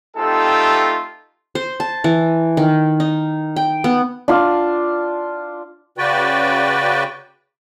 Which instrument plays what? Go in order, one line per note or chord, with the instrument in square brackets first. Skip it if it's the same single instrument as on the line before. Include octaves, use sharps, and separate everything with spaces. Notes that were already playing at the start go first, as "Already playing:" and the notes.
[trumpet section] A3 C4 D#4 F4 G4 A4
[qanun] C5
A5
E3
D#3
D#4
G5
B3
[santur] D4 F4
[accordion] C#3 F#4 B4 D5 G5